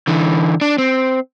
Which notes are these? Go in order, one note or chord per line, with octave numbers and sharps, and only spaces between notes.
D3 E3
D4
C4